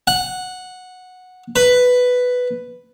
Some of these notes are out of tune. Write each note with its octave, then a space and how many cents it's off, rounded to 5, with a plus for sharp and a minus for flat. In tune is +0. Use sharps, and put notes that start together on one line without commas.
F#5 -10
B4 +5